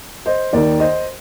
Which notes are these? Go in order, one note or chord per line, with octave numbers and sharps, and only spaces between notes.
C5 D#5
D#2 D#3 A#4 D5
C5 D#5